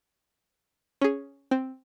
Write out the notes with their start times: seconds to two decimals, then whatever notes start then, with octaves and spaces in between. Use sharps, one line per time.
1.01 C#4 G#4
1.51 C4